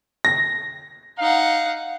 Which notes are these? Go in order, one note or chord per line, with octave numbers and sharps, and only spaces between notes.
A#6
D#4 F5 F#5